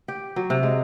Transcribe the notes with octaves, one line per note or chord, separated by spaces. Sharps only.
G4
F#3
C3
G#3